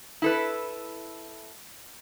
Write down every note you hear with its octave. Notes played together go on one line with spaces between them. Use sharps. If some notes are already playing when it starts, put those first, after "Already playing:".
E4 A4 B4